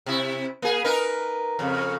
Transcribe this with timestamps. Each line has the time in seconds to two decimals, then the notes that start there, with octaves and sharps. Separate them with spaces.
0.06 C3 E4
0.62 A#3 G#4
0.84 D#4 A#4 B4
1.59 F2 C#3